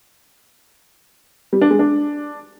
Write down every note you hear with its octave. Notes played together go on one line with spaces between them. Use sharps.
G3
D4
G#3
D4